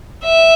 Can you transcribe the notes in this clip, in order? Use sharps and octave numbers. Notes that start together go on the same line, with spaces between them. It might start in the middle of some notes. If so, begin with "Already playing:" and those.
E5